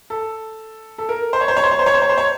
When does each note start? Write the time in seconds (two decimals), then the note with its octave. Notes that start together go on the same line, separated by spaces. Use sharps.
0.10 A4
0.98 A4
1.09 A#4
1.33 C5
1.41 C#5
1.48 C5
1.57 C#5
1.64 C5
1.72 C#5
1.79 C5
1.86 C#5
1.94 C5
2.02 C#5
2.09 C5
2.18 C#5